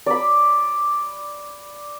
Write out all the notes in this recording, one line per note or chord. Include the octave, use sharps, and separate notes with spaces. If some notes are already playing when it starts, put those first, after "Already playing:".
D5 B5